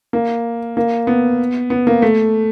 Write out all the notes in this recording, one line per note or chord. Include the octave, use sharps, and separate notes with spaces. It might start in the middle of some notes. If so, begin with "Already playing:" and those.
A#3
A#3
B3
B3
A#3
A3